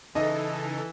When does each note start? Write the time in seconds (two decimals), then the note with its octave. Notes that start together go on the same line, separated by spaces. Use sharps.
0.15 C#3 E3 D#4 A4 D#5